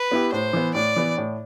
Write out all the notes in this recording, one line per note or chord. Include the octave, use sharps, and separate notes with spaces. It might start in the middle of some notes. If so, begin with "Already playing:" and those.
Already playing: B4
B3 E4 G4
A2 C5
E3 B3
A2 D5
E3 B3
A2